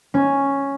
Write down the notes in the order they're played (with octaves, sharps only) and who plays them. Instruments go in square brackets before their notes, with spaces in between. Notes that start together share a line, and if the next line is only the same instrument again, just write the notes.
[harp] C#4